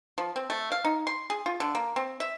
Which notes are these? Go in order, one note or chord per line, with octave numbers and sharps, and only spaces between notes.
F3
C4
A3
F5
D#4
C6
G#4
F4
D3
A#3
C4
E5